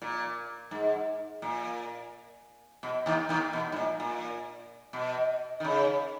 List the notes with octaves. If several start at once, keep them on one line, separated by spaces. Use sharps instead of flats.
A#2
G#2
A#2
B2
D#2 D#3
D#2 D#3
B2
G#2
A#2
A#2
B2
D#3
C#3